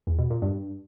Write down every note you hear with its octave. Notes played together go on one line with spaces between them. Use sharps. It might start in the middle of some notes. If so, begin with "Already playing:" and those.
E2
B2
A#2
G2